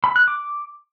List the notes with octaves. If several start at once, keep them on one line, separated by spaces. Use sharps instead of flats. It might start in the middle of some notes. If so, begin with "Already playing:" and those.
B5
F#6
D6